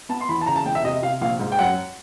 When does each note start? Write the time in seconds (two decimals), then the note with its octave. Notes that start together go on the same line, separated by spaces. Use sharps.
0.09 B3 A5
0.21 C6
0.29 E2 B5
0.41 A5
0.46 C#3 A#5
0.56 A5
0.65 E1 G5
0.75 E5
0.84 C3 D#5
1.02 C3 F5
1.21 A#1 F5
1.40 G#2
1.52 G5
1.59 F#2 F#5